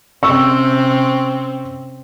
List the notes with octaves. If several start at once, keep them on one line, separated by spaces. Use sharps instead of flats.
C3 C4 C#4 C#6 E6